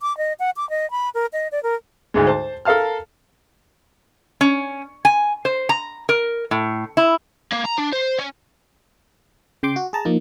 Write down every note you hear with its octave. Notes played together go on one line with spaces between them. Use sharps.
D6
D#5
F#5
D6
D#5
B5
A#4
D#5
D5
A#4
D2 G#2 G#3
C5 A5
A4 A#4 F5 A5 F6
C#4
G#5
C5
A#5
A#4
A2
E4
A#3
A#5
D4
C5
C#4
C#3 G5 C6 D6
F#4
G#4 A5 A#5
F3 A#3 D#4